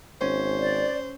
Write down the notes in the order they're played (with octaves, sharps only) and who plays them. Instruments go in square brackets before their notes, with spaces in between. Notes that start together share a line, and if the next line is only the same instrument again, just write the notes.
[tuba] G#1 [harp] C#4 [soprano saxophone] C5
[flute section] D5